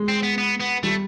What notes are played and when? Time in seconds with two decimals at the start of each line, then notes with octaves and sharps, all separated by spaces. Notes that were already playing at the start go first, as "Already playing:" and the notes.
Already playing: G#3
0.08 C4
0.23 B3
0.38 B3
0.61 B3
0.83 G3 A3